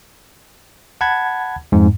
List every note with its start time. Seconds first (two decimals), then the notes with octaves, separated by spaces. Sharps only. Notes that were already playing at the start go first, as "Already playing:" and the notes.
1.01 F#5 A5 B5 G#6
1.72 F2 G#2